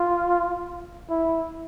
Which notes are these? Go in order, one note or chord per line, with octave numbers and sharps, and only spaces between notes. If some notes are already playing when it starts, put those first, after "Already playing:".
Already playing: F4
E4